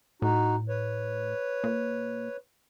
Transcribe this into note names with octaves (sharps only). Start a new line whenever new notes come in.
A2 D#4 F#4
B4 C#5
A#2